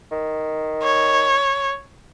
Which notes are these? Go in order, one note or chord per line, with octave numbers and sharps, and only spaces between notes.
D#3
C#5